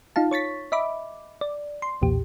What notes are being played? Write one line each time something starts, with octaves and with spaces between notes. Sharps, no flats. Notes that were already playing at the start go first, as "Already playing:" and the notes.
D#4 F4 F5 A5
C#5 C#6 A6 B6
D#5 E5 B5 D6
D5
C6
B1 E2 A#2 G4